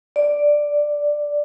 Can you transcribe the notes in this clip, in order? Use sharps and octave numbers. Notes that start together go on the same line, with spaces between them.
D5